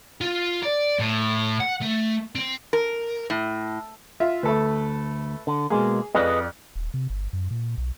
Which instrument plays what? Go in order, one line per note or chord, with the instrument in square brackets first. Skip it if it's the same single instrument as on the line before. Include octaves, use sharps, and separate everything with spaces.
[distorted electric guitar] F4
D5
A2
F#5
A3
C4
[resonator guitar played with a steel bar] A#4
A2
[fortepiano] F4 E5
[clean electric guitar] D2 [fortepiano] A3 A4 B4
[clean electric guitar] D3
[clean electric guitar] B2 G#3 A#3 [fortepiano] G#4
[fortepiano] F2 D5 [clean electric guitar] G#4 B4 D#5
[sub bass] D#1
C3
G1
F#2
A#2
B1